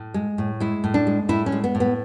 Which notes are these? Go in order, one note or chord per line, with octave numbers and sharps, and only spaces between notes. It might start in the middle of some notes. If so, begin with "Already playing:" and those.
Already playing: A2
G#3
A2
G#3 E4
A2
D4
G#3
A2 E4
C#4
G#3
B3
A2
B3